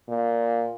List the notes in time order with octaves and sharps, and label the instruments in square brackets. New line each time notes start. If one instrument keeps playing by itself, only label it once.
[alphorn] A#2